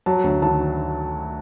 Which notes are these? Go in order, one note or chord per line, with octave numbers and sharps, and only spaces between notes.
F#3 A5
D2
D#3 A5